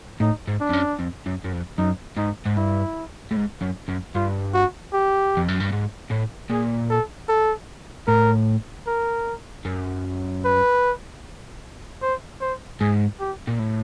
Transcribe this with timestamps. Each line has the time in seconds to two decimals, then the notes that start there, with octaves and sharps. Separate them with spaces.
0.20 A2 D#4
0.47 G#2
0.60 D4
0.69 F2
0.73 F#2
0.99 F2
1.26 F#2
1.44 F#2
1.52 F2
1.78 F#2 D#4
2.17 G#2 D#4
2.46 G#2
2.57 G2 E4
3.31 A2
3.36 G#2
3.62 F#2
3.89 F#2
4.15 G2 F4
4.54 F#4
4.93 G4
5.37 F2
5.49 F#2
5.61 G2
5.72 G#2
6.11 A2
6.50 A#2 G#4
6.90 A4
7.29 A4
8.08 A2 A#4
8.87 A#4
9.65 F#2
10.45 B4
12.02 C5
12.41 C5
12.80 G#2 G#4
13.20 G4
13.47 A#2
13.59 A2